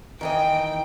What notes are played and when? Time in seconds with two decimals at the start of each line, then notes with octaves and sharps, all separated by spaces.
0.21 D#3 E3 D#5 G5